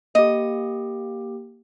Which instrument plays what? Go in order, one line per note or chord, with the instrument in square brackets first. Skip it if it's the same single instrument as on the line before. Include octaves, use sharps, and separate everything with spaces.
[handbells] A#3 G4 [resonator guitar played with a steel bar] D#5